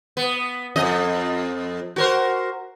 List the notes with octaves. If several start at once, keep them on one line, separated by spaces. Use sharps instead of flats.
B3
F2 D#5
F#4 A#4 C5